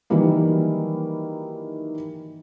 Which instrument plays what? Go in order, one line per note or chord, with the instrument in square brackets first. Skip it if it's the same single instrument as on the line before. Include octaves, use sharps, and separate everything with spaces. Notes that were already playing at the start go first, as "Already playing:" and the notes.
[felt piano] D#3 E3 F#3 G3 A#3 E4